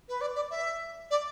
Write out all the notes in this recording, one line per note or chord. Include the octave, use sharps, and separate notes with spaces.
B4
D5
D5
E5
D5